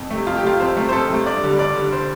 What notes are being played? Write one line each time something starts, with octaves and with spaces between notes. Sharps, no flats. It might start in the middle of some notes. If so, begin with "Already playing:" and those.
Already playing: F2
C3 A3
F2 F4
G4
C3 A3 F4
F2 C5
C3 A3
C5
F2 A4
C3 A3
G2 D5
D3 G3
G2 D5
D3 G3
C5